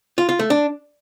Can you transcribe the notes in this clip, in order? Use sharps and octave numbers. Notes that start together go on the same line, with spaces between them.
F4
F4
A3
D4